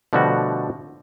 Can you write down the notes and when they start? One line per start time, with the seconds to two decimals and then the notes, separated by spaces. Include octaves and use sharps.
0.13 B2 D3 F3 G3 A3 F#4